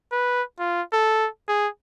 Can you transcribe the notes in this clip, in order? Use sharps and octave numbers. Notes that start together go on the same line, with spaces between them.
B4
F4
A4
G#4